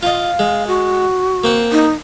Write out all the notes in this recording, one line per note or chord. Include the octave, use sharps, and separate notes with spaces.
F4 D#5 F5
G#3
F#4
A#3 C4 F#5
D#4